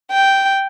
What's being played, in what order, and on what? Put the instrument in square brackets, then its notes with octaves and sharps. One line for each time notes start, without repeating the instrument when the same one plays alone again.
[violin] G5